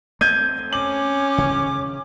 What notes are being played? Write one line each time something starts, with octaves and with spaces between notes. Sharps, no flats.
A3 A#3 C4 G6 G#6 D#7
C#4 D6 F#7
C#3